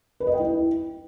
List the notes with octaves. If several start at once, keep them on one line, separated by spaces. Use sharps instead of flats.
B4
D#5
G5
E4